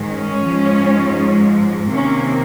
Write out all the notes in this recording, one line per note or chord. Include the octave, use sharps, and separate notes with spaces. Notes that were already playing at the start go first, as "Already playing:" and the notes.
Already playing: G#2 D#3 G#3
C#4
G#2 F3 G#3
C3 D#3 A#3 C#4